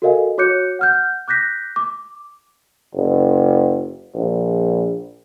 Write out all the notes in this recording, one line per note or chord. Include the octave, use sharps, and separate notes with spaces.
F#4 A4 A#4 D#5 F5 G#5
F#4 C#5 D6 F#6 G6 C#7
F#5 F6 G6
D6 F#6 G6 A#6 B6
D6
F#1
A#1